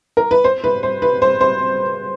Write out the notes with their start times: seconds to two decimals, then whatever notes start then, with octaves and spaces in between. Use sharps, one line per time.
0.17 A#4
0.31 B4
0.44 C5
0.64 B4
0.83 C5
1.02 B4
1.22 C5
1.41 C5